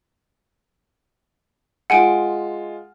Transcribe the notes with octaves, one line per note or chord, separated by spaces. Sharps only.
G#3 F4 F#5 G#5 D7